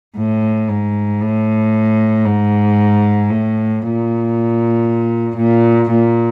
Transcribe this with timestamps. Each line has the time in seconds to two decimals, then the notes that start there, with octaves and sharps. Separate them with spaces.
0.16 A2
0.68 G#2
1.21 A2
2.25 G#2
3.30 A2
3.82 A#2
5.37 A#2
5.90 A#2